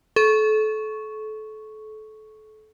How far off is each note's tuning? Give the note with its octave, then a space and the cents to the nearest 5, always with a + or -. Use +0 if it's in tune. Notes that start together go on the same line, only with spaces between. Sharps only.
A4 -30 C#6 +0